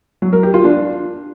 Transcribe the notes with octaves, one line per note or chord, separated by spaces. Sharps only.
F#3
A#4
G4
F4
D4